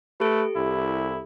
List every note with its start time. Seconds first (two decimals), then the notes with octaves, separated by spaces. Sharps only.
0.20 A3 G4 A4 B4
0.56 C2 E4